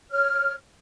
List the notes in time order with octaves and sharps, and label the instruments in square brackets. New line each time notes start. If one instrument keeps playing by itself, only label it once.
[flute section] C#5 F6